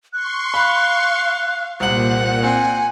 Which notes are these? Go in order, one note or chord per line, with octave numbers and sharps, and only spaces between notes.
C6 C#6 F#6
F5 B5
C2 A#2 C5 F#5 F#7
C4 G#5